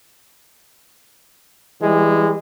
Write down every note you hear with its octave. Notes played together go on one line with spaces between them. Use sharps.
E3 G3 G#3